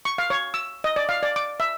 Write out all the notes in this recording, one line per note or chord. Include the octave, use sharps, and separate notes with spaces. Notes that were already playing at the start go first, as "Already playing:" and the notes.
C#6
F5
C#5
E6
D#5
D5
F5
D5
D6
E5